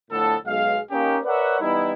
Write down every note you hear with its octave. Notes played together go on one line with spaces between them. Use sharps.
A2 D3 F3 A3 B3 A4
B1 G#3 F5
A#3 C#4 D#4 G4
A#4 B4 C#5 D5 E5 F#5
E3 G3 B3 D#4 E4